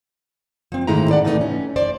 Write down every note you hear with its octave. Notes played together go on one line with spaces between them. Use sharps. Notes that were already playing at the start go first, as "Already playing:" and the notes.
F3 C4
G#2 D#3 G#3 A3 E4 A#5
A4 D5 F#5
A2 C3 E3 A3 B3 D#4
C#4
C5 D5